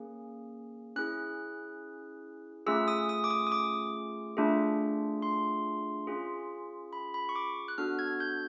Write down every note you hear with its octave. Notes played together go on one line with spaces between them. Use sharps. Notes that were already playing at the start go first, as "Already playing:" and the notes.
Already playing: A#3 C#4 G#4
C#4 E4 G#4 F#6
A3 C#4 F4 G#4 E6
D#6
D#6
D6
D#6
D#6
D6
A3 D4 F4 G#4
C6
C#4 F4 G#4
B5
B5
C#6
D6
F#6
B3 D4 F#4 A4 F6
G#6
G6